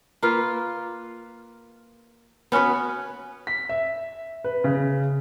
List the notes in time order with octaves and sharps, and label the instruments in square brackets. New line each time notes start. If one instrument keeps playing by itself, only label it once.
[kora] A#3 F4 B4
B3 C#4 F#4 B4
[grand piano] B6
E5
B4
C#3